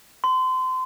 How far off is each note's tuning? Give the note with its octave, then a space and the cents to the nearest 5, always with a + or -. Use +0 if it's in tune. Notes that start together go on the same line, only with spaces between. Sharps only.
C6 -30